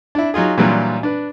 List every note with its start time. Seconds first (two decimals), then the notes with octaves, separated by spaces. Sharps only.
0.15 D4 E4
0.34 F#3 D#4 F4 G#4
0.58 A#2 E3 F#3 G3 D4 F4
1.03 D4 B4